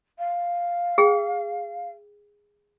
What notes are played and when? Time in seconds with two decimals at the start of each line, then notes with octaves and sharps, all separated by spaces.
0.18 F5
0.98 G#4 G5